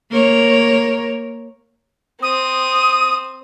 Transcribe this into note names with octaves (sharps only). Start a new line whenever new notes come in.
A#3 A#4 C#5
C4 D#6